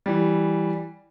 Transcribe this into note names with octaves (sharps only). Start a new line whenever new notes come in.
E3 G3